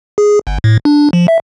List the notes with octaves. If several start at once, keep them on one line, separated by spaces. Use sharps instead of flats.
G#4
G1
A2
D4
F3
E5